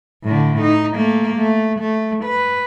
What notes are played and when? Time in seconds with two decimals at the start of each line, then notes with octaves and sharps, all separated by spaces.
0.24 A2 D3
0.62 D#4
0.96 A3 A#3
1.36 A3
1.80 A3
2.24 B4